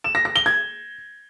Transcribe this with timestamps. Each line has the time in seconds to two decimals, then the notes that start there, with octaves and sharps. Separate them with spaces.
0.04 E7
0.15 A#6
0.25 A#6
0.36 G7
0.46 G#6